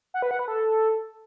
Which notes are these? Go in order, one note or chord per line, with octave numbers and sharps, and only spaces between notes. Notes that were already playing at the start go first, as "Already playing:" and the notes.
F#5
B4
F#5
B4
A4